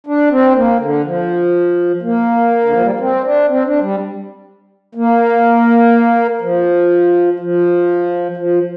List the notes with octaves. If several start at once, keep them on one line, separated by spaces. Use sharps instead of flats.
D4
C4
A#3
D3
F3
A#3
D3
F3
G3
A#3
C4
D4
C4
D4
G3
A#3
F3
F3
F3